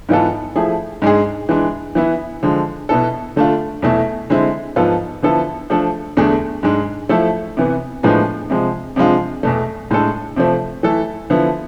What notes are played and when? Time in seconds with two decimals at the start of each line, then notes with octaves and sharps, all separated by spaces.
0.09 G#2 E3 B3 F4 A4
0.56 F3 A3 E4 G#4
1.02 G#2 G#3 D4 G#4
1.49 E3 G#3 D4
1.95 E3 B3 E4
2.43 D3 F3 G#3
2.89 B2 B3 E4 A4
3.36 D3 A3 D4 F4
3.82 E2 B2 A3 E4
4.30 D3 G#3 C4 E4
4.76 G#2 F3 B3 F4 A4
5.23 D3 F3 B3 E4 A4
5.70 F3 A3 D4 A4
6.17 E2 D3 A3 D4 G#4
6.63 G#2 G#3 D4
7.09 F3 A3 E4 A4
7.57 C3 E3 B3
8.03 A2 F3 G#3 B3 D4
8.50 C3 F3 G#3
8.96 C3 F3 G#3 D4 F4
9.43 E2 B2 A3
9.91 A2 G#3 D4 A4
10.36 C3 F3 A3 C4
10.83 E3 A3 E4 A4
11.30 D3 F3 B3 E4